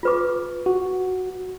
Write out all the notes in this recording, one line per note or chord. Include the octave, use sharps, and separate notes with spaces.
F4 B4 D6
F#4